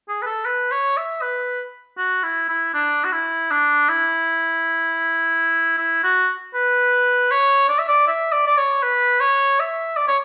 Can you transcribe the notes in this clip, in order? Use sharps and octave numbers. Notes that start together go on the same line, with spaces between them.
G#4
B4
A4
B4
C#5
E5
B4
F#4
E4
E4
D4
F#4
E4
D4
E4
E4
F#4
B4
C#5
D5
E5
D5
E5
D5
D5
C#5
B4
C#5
E5
D5
C#5